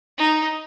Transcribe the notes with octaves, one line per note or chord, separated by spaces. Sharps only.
D#4